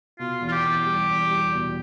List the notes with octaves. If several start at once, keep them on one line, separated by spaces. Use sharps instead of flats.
B2 F4
E2
F4
G4
E2
G3
E2
G3
B2